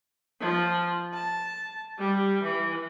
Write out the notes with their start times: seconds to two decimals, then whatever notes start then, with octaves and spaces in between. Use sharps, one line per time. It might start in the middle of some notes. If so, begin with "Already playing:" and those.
0.41 F3
1.14 A5
1.98 G3
2.43 E3